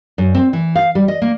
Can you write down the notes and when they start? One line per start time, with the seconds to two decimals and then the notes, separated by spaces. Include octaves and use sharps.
0.18 F#2
0.35 C4
0.53 E3
0.76 F5
0.95 G3
1.08 D#5
1.22 A#3